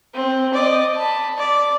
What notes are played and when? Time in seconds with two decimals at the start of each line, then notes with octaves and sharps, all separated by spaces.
0.14 C4
0.54 D5 D#5
0.96 A5 B5
1.38 D5